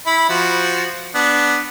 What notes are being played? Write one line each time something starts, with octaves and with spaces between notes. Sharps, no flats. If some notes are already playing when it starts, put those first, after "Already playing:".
E4 B5
F3 F#4
B3 D4